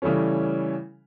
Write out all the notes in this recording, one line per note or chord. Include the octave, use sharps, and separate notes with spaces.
C#3 E3 G3 A3 C#4